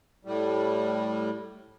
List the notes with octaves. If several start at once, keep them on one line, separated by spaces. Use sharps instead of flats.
A2 G3